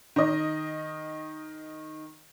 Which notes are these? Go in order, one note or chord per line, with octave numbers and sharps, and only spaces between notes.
D#3 D#5